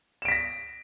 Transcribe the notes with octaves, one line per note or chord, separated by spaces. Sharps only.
A#6 B6 D7 E7